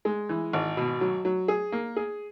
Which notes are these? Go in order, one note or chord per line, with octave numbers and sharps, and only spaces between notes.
G#3
E3
G#1
B2
F#3
F#3
G#4
A#3
G#4